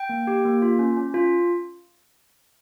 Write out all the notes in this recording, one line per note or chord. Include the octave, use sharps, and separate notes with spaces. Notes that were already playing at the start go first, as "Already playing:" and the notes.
Already playing: G5
A#3
G4
A#3
F4
C#4
C#4
F4